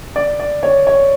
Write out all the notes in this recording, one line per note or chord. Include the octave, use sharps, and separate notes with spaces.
D5
D5
C#5
C#5